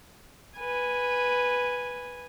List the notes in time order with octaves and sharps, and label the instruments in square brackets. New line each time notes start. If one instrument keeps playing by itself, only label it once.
[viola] B4 G#5